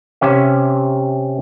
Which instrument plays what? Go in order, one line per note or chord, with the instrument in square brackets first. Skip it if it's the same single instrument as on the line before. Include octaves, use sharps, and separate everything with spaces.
[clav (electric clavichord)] C3 C#4 E5